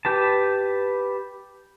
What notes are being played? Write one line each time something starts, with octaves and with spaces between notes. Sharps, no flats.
G4 B4 A5